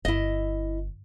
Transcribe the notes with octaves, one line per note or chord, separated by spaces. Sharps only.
G1 E4 D#5